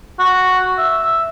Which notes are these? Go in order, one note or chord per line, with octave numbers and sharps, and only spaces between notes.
F#4
E5